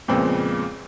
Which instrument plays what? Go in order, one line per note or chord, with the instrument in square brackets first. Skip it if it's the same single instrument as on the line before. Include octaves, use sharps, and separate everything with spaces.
[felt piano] F2 A#2 C#3 G#3 B3 C4